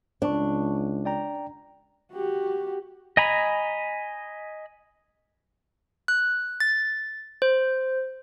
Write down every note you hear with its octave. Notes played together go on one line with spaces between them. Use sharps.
C#2 D4 A5 C#6
D5 G5 A#5
F#4 G4
D#5 G#5 A#5 B5
F#6
A6
C5